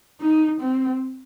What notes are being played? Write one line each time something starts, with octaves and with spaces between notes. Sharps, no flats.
D#4
C4